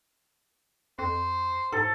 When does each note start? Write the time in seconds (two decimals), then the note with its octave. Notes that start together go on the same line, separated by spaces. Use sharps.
0.99 F2 C5
1.72 G#2 A4